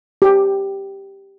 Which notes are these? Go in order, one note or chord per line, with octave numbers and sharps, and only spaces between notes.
G4